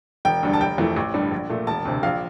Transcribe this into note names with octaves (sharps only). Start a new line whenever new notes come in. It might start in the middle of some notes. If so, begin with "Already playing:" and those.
E1 G5
D2 D3 G3
A5
F1 G5
F2 E3 A3
A1
G2 D3 G3
A#1
A#2 A3
E1 A5
D2 C3
A#1 F5